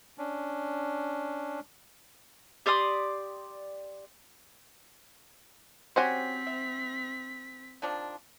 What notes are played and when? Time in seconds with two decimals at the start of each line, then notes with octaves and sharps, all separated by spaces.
0.18 C#4 D4
2.66 G4 D5 C6 D#6
5.96 C4 C#4 F#4 G4 C5 F#5 G#5 B6
6.47 E5
7.82 D#3 F3 D4